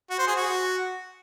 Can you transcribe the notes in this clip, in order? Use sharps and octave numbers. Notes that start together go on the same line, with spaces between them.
F#4
C5
G#4
F#4